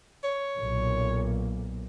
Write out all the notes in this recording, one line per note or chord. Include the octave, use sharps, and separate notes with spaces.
C#5
B1 A#2